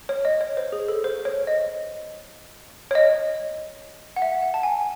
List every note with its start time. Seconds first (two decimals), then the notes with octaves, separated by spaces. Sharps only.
0.09 C#5
0.25 D#5
0.41 C#5
0.57 C5
0.72 G#4
0.88 A4
1.04 C5
1.25 C#5
1.47 D#5
2.91 C#5
2.95 D#5
4.16 F#5
4.22 E5
4.42 F#5
4.54 A5
4.63 G#5